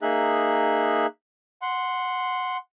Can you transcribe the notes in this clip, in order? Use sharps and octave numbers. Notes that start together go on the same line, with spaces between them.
A#3 D#4 G#4 E5 F#6
F#5 C6